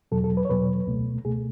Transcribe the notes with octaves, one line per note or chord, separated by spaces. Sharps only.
E2 B2 F#3 A4
A4
B4
C#5
E2 B2 F#3 B4
C#2 B2 A3
C#2 B2 A3 G#4